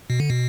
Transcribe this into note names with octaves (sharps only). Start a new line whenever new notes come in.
B2
D3
B2